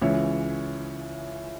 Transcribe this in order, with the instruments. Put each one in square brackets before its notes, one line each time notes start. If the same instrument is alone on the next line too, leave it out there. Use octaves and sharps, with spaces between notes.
[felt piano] C#2 C#3 E3 C#5 E5